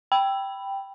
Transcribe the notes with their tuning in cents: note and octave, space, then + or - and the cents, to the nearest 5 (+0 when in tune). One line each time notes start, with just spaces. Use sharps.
G5 +0 B5 +0